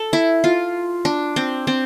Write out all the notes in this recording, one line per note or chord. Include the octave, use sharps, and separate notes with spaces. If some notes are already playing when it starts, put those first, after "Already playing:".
Already playing: A4
E4
F4
D4
C4
C4